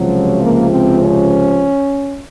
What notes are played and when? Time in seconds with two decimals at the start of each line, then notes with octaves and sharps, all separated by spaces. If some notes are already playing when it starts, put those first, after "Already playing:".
Already playing: C#2 C3 F3 F#3
0.42 A#3
0.71 C4
1.00 C#4